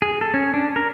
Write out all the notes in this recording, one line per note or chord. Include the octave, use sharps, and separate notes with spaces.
G#4
A4
C#4
D4
A#4